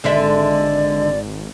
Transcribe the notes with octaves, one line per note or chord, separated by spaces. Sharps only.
G#1 D3 G#3 D5 E5